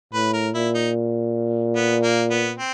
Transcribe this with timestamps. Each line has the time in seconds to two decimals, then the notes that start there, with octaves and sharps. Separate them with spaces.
0.14 A2 B4
0.33 A#4
0.54 A#2 E4
0.75 D#4
1.76 B3
2.03 A#3
2.30 B3
2.58 C4